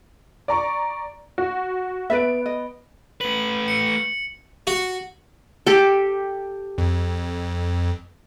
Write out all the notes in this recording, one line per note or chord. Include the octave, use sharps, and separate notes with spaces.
D5 A#5 C#6
F#4
B3 B4 D5 E5 D7
D#5
A3 B4 F#7
C#7
F#4
G4 A4
F2